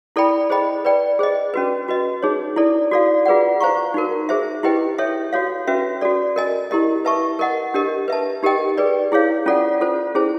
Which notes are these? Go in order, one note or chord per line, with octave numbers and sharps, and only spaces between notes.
E4 A4 D5 G5 B5
G#4 C5 D#5 G5 B5
B4 D5 G5
G#4 C5 D#5
C#4 F#4 B4
F#4 B4 D#5
D#4 G#4 C#5
E4 A4 D5
F#4 A4 D5 F5
F4 G#4 B4 D5 F#5
C5 F5 A#5 C#6
D#4 F#4 A#4
G#4 C5 E5
E4 G4 B4 D#5 G5
A4 C#5 E5
F#4 A4 C#5 F5
C#4 F#4 B4 E5
F#4 A4 D5
A#4 D#5 G#5
E4 G4 A#4 D#5
B4 E5 A5 C#6
A#4 D#5 F#5
D4 G4 A#4 D#5
B4 E5 A5
D#4 G4 A#4 D#5 G5
G#4 B4 D5
E4 G#4 C#5 F5
C#4 F4 A4 D5 F#5
F4 A4 C5
C#4 E4 G#4 C5